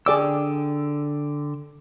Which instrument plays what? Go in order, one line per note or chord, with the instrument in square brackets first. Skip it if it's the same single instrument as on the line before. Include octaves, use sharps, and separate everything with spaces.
[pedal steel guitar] D3 G5 E6 [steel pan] G#4 D5 D6